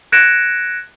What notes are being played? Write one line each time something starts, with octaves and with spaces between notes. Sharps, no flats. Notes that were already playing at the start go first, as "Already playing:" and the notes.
F#6 G#6 A#6 C#7 D7 E7